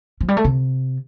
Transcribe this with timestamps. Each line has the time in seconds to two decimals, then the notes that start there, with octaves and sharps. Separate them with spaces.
0.21 F3
0.28 G3
0.37 A3
0.44 C3